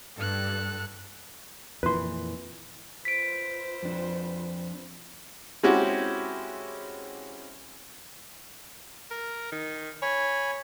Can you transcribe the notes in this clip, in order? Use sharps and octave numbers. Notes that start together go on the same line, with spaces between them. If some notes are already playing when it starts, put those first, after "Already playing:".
G2 A4 F#6
F2 A#2 E3 B4 C6
F4 B4 C5 B6 D7
F2 D4
G#3 C4 C#4 E4 F#4 G4
A#4
D#3
C#5 G#5 B5